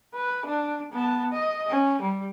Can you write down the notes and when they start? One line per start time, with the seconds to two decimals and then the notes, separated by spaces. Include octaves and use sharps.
0.14 B4
0.46 D4
0.92 B3 A5
1.32 D#5
1.69 C#4
2.02 G3